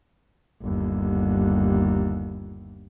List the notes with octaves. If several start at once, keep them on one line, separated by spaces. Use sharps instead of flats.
G1 D#2